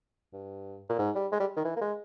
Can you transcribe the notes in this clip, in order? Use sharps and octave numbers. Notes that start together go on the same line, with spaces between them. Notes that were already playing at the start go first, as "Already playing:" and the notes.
G2
A#2
G#2
G3
G#3
G3
D#3
E3
A#3
G#3